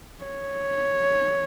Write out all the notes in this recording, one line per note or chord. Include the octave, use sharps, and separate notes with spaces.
C#5